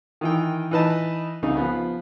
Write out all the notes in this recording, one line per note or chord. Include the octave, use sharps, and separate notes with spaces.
D#3 E3 G5
E3 D#4 B4 D#5 A5
C2 C#3 D#4
F3 B3